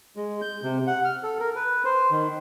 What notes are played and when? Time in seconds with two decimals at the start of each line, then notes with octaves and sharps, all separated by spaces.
0.16 G#3
0.41 G6
0.63 C3
0.87 F#5
1.05 F6
1.23 A4
1.40 A#4
1.56 B4
1.85 C5
2.11 D#3